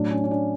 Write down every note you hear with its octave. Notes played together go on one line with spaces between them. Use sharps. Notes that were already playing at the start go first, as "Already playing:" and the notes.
Already playing: A2 F#3 D4
C#4
C#4
D4